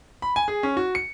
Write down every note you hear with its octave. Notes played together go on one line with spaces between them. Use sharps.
B5
G#5
G#4
C#4
F#4
C#7